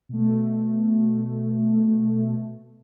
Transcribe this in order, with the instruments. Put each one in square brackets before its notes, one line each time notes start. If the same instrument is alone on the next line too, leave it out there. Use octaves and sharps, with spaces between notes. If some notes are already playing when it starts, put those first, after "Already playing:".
[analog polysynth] B2 A3